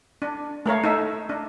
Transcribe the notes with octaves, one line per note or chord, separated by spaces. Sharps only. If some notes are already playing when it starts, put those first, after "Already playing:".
D4
A3 A#4 C#5 F5
D#4 A4 E5
D4